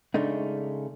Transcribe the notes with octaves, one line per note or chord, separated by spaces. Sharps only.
C#3 G#3 A3 D4 D#4